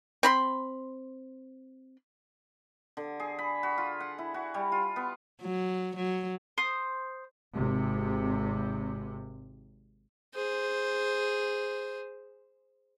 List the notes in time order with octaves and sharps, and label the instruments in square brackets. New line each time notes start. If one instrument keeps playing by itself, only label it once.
[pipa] C4 B5 C6
[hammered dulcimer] D3
G#4
B5
F#4
F4
F#5
E4
F#4
G3
F4
B3
[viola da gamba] F#3
F#3
[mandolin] C5 D#6
[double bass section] G#1 C3
[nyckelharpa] G#4 C5